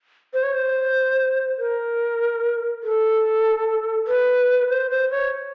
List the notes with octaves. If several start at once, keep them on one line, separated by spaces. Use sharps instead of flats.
C5
C#5
C5
A#4
A4
B4
C5
C5
C#5